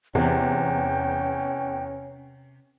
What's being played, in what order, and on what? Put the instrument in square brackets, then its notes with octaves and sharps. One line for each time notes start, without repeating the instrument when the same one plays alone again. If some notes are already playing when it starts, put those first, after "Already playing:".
[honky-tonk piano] E2 [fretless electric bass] C3 [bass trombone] C#4 [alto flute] G5